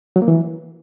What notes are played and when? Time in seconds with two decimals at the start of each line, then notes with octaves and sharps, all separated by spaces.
0.16 F#3
0.22 A#3
0.28 E3